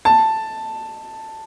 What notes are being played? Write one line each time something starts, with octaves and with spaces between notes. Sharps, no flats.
A5